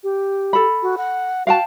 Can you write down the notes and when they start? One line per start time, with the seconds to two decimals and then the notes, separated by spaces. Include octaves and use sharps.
0.04 G4
0.53 A4 B5
0.82 F#4
0.98 F#5
1.47 F#4 F5 G5 A5